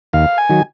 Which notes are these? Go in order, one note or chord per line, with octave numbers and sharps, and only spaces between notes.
D#2 F5
G#5
D#3 F#3